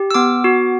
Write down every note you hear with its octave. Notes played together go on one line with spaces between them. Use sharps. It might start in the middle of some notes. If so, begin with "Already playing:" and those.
Already playing: G4
E6
B3 D6
F#4